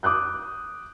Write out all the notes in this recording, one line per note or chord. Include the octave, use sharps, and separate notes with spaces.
D6 D#6 F#6 G6